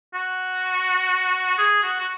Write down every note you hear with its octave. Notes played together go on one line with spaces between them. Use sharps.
F#4
G#4
F#4
F#4